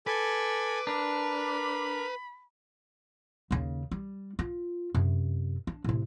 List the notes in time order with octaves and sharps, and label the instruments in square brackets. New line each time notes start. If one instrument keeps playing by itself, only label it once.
[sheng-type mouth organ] A4 G#5 [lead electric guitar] B4 [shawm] D6
[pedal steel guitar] D4 [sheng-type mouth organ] A#4 A#5 [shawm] B5
[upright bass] D#2 C#3
G3
F4
F#2 C3
D4
A2 C3